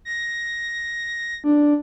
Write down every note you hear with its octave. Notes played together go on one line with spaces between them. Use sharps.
A#6
D4